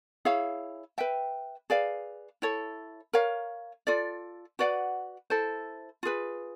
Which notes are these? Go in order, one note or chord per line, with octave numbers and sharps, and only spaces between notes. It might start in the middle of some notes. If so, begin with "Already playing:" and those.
E4 G#4 C#5 F5
B4 E5 G5
G#4 B4 D5 F5
E4 A4 C#5
A#4 C#5 F5
F4 A4 D5
F#4 B4 D5 F#5
E4 A4 C5
F4 G#4 B4